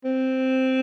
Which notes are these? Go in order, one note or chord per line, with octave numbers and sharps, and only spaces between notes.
C4